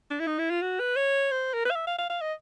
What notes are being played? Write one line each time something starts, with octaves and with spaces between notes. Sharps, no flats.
D4
E4
D#4
E4
F4
F#4
B4
C#5
C5
A#4
B4
F5
E5
F5
F5
F5
D#5